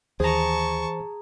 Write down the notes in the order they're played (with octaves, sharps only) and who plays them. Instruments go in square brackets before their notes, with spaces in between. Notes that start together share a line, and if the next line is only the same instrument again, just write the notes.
[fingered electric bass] D#2 [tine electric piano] E3 C5 [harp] G#4 A#5 [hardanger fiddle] A5 C#6